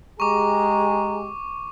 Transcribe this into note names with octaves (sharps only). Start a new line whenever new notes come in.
G#3 G4 G#4 A#5 C#6 D6